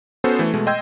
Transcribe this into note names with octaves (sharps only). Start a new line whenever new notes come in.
B3 C#4 F#4 A4 C5
E3 A3
B2 G#3 A3
D#5 G5 C6 E6 G6 G#6